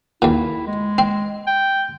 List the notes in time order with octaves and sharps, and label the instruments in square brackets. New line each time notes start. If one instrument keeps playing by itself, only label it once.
[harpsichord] D#2 A#2 [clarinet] E4
[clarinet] G#3
[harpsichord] C4
[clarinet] G5